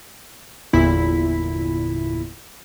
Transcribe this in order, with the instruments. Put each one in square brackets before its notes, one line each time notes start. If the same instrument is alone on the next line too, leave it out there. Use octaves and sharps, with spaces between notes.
[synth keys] G1 E2 A#2 E4 B6